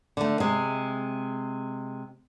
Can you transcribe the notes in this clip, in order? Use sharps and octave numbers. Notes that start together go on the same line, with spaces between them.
D3 A3
C3 G#3